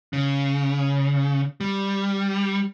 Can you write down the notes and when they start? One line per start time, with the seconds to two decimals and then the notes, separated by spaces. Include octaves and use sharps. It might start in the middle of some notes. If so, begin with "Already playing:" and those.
0.13 C#3
1.61 G3